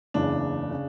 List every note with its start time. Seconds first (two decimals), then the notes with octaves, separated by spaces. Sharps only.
0.14 F#1 E2 C#3 D4
0.71 C#3